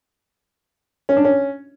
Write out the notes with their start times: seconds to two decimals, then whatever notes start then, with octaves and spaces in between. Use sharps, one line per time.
1.09 C#4
1.17 D4
1.25 C#4